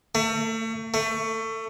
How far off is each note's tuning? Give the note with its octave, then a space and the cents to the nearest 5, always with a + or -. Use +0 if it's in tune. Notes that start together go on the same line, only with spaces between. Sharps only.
A3 +35
A3 +25